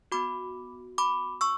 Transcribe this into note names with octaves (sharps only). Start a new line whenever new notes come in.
B3 F#4 B5 D6
B5 D6
C#6 E6